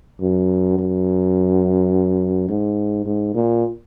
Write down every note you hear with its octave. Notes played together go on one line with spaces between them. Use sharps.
F#2
F#2
G#2
G#2
A#2